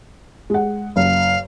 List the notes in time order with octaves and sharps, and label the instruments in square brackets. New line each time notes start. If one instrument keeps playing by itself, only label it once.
[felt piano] G#3 F#5
[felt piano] F#1 [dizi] F5